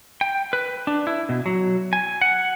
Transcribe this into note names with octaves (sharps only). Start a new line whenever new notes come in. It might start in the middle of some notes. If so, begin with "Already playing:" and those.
G5
B4
D4
E4
B2
F#3
G#5
F#5